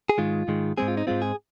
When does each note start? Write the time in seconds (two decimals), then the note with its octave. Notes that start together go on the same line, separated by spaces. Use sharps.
0.09 G#4
0.18 G#2 D#3 G#3 F4
0.48 G#2 D#3 G#3
0.77 G#2 G#3 C4 G#4
0.88 F4
0.97 D#4
1.07 G#2 G#3 C4 F4
1.22 G#4